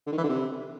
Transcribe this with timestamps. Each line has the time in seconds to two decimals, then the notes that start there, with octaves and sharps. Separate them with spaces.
0.07 D3
0.12 D#3
0.18 E3
0.24 D3
0.29 C3